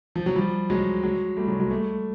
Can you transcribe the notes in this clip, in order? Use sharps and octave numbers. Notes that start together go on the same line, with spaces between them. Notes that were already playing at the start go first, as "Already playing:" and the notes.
F3
F#3
F3 G3
F#3 G#3
F#3 G#3
G3 A3
F#3 G#3
F#3 G#3
G3 A3